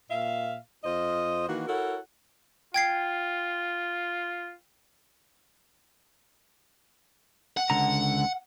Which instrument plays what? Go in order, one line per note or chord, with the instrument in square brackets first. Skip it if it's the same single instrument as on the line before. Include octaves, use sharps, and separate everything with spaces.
[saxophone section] A#2 E5 F5
F2 F4 C5 D#5
D#3 E3 A#3 F#4
E4 F#4 A4 A#4 C#5 F#5
[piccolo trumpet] F4 [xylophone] G5 G#6 C7
[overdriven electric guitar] F#5
[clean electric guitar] C#2 D3 A#5